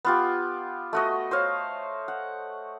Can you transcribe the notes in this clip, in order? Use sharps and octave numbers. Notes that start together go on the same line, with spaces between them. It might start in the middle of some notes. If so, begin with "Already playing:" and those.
B3 F4 G4
A3 F#4 D#5
C5 C#5 F5
F#5